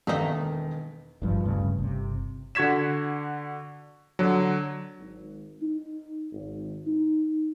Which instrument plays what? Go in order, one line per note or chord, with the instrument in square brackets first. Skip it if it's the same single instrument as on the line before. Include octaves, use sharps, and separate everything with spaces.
[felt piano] E1 D#3 B6 [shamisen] A3 A#3 D#4
[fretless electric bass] G#1 G2 F3
D1 G2 C#3 A3
G1 C3
[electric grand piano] D3 F#4 C#6 G#6 B6 E7
D3 F#3
[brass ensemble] G#1
D#4
G#1
D#4